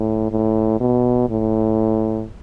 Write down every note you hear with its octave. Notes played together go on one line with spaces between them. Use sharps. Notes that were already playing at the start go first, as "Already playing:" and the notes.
Already playing: A2
A2
B2
A2